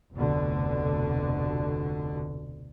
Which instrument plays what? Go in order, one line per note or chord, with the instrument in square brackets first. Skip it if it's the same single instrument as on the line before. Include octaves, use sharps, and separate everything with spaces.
[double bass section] F1 D2 B2 D3